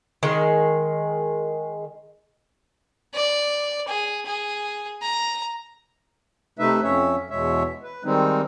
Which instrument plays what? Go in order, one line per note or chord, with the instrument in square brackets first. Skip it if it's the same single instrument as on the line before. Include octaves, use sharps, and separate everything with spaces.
[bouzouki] D#3 G#3
[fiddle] D5
G#4
G#4
A#5
[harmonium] C3 A3 D#4 B4 E5
F2 C#4 C#5 E5
E2 B2 G#3 C#5 E5
B4
D#3 G3 G#3 C4 D#4